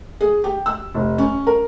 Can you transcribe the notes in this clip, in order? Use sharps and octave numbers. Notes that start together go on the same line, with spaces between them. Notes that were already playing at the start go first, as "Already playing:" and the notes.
G#4
G4
E6
F1
C#4
A#4